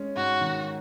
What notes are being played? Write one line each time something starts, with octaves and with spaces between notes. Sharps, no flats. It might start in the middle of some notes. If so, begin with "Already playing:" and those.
Already playing: G#3 C#4
G#2 F#4
D#3